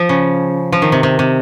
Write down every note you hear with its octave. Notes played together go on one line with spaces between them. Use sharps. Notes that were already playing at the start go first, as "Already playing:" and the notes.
Already playing: F3
C#3
F3
D#3
C3
C3
C3